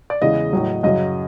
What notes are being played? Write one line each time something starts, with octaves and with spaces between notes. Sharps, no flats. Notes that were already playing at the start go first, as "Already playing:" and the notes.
D5
E2 C#3 E3 G#3 D#5
A2 F#3
F#2 C#3 F#3 D#5